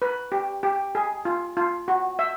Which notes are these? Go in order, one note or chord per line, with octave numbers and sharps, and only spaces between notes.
B4
G4
G4
G#4
F4
F4
F#4
E5